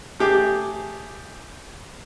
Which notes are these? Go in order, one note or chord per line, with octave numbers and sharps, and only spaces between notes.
A3 G4 G#4 D6